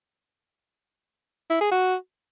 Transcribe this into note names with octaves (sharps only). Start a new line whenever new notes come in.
E4
G#4
F#4